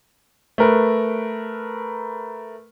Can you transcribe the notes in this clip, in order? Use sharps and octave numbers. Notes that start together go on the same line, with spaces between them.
A3 A#4 B4